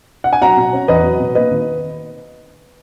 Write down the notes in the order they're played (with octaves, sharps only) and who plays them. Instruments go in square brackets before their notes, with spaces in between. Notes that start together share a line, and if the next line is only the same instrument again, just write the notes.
[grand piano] F#5
G#5
F#3 F#5 A#5
B2
C#4
E2 B4 D#5
F#3
B2
A#3 B4 D#5
D#3